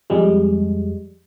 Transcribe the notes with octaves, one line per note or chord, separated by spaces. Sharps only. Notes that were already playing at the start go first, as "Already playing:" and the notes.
F2 G3 G#3